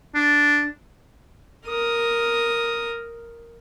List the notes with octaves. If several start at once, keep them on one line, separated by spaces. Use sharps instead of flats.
D4
A#4 D#6